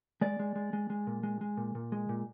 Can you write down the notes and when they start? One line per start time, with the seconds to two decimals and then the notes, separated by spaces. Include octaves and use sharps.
0.21 G#3 D5
0.39 G#3
0.56 G#3
0.73 G#3
0.90 G#3
1.07 A#2
1.23 G#3
1.41 G#3
1.57 A#2
1.75 A#2
1.92 G#3
2.09 A#2